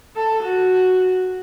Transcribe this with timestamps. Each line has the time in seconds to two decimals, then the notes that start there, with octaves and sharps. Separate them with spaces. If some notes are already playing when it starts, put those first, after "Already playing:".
0.16 A4
0.43 F#4